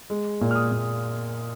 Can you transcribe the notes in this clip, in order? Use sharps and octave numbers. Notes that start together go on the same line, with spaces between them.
G#3
A#2
F6
D#6
A#2